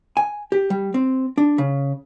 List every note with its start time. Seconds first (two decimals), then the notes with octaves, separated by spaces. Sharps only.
0.17 G#5
0.52 G4
0.70 G3
0.94 C4
1.38 D4
1.58 C#3